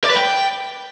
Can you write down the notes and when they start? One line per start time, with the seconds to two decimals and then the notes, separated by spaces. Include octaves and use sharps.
0.04 D5
0.10 B4
0.16 G5